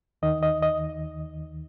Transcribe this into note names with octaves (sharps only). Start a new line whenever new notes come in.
D#2 D#3 D#5
D#5
D#5